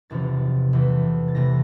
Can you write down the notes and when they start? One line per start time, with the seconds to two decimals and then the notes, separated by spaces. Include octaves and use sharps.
0.10 F#1 E2 C3 F3 A6
0.73 E2 C3 E3 A3
1.28 A6
1.35 E2 C3 E3 A3 A#6